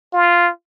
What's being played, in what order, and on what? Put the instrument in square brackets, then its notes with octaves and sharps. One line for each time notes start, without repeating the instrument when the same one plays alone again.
[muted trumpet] F4